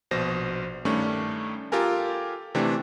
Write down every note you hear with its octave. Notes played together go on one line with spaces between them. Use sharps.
A#1 B2 C5 A#6
G2 D#3 A3 C#4 D4
F4 G4 A4 A#4 G#5
C3 E3 A3 D4 G4